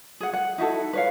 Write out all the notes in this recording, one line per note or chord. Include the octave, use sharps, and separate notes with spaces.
G#4 F#5
F#5
D#4 E4 F#4 A4
B4 C#5 F5